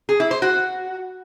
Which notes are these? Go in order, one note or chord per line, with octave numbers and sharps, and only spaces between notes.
G#4
E4
C5
F#4